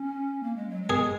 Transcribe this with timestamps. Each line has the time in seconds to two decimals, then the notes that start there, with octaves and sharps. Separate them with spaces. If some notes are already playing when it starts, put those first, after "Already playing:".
Already playing: C#4
0.43 A#3
0.56 G#3
0.69 F#3
0.83 G#3
0.90 G#4